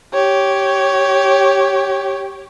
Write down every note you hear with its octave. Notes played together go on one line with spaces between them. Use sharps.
G4 C#5